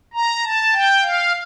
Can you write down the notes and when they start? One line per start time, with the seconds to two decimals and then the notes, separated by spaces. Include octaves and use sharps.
0.14 A#5
0.43 A5
0.73 G5
1.02 F5